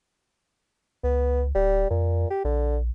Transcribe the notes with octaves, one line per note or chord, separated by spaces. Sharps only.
C#2 B3
D1 G3
F2 A#2
G4
A#1 D3